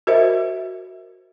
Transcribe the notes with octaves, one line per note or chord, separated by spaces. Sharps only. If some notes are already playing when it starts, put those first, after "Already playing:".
F#4 A#4 C5 D#5 E5